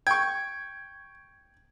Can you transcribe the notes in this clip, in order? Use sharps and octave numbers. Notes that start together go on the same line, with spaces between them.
G5 C#6 G#6